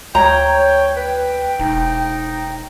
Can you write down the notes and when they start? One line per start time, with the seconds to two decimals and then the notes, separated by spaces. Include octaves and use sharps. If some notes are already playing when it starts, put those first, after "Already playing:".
0.15 D2 C#5 G5 A#5
0.96 B4 G5
1.59 E1 D#4